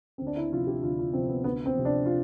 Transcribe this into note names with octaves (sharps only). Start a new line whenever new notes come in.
D2 C4
D4
E4
C3 F3 F4
G4
D2 F4
F4
C3 F3 C4
B3
D2 B3
C4
C3 F3
D4
F4